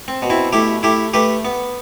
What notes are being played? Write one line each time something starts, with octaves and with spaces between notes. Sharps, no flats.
C4
B2
C4 E4
A3 E4 G4
A3 E4 G4
A3 G4 B4
B3